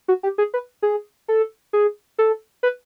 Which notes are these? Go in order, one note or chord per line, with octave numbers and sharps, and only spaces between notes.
F#4
G4
G#4
B4
G#4
A4
G#4
A4
B4